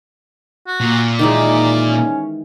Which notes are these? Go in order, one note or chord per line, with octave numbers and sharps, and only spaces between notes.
F#4
A#2
D#3 E3 G#3 D#4 D5
C#4